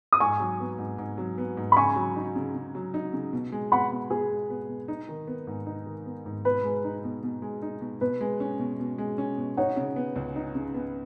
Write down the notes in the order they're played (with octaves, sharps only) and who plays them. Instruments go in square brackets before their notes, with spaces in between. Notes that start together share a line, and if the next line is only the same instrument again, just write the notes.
[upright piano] D#6
[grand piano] G#2 [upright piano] G#5 C#6
[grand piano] F#3
B3
G#2
G#2
F#3
B3
G#2
[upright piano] B5
[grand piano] C#3 [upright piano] G#5 C#6
[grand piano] F#3
D#4
C#3
C#3
F#3
D#4
C#3
B2
G#3
[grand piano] B3 [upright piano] F#5 B5
[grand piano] B2
[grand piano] B2 [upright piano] G#4
[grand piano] G#3
B3
B2
D#4
D#3
B3
G#2
D#4
D#3
B3
G#2
[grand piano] B2 [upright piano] B4
[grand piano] G#3
D#4
B2
B2
G#3
D#4
B2
[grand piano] B2 [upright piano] B4
[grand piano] G#3
C#4
B2
B2
G#3
C#4
B2
[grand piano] D#4 [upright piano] C#5 F#5
[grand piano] C#3
B3
C#2
D#4
C#3
B3